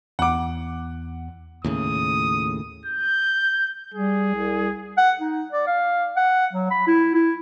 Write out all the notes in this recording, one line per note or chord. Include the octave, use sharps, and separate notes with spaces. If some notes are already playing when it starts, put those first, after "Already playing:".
E2 F#5 D6
D#2 A2 C#3 D#6
G6
G3 G#4
C2
F#5
D#4
D5
F5
F#5
F#3
B5
E4
E4